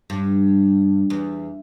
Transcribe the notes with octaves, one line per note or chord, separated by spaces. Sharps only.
G2
E2